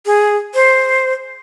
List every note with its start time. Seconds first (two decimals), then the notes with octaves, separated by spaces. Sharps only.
0.06 G#4
0.54 C5